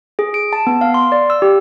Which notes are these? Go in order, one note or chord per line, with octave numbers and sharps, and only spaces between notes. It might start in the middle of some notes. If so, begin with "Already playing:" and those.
G#4
D7
A5
B3
F5
C6
D5
E6
G4